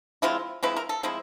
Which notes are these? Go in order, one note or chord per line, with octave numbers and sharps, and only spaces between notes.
F3 G#3 C4 E4 F4
F3 G#3 C4 E4 B4
A#4
A4
F3 G#3 C4 E4